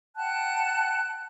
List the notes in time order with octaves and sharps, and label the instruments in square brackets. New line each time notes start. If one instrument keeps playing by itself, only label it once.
[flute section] F#5 G5 A5 F#6